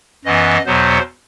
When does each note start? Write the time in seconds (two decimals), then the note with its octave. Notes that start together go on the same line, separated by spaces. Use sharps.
0.25 F#2 E3 B3 D#5
0.66 E2 B2 F#3 B3 C5